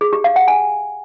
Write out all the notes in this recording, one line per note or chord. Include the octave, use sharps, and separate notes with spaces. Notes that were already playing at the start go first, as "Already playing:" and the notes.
G#4
G4
F5
F#5
G#5